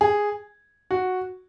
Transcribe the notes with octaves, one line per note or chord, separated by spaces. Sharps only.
G#4
F#4